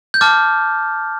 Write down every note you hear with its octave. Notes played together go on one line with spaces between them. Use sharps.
G6
A5 D6 F6 A6